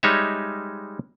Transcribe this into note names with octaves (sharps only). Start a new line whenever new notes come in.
G3 G#3 D#4 C#5 E5